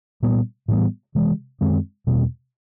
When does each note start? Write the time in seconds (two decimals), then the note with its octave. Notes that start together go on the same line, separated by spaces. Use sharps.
0.23 A#2 G3 B3
0.68 A2 E3 G3 B3
1.15 C3 E3 G#3
1.61 F#2 D#3 G#3 C4
2.07 E2 B2 G3 C4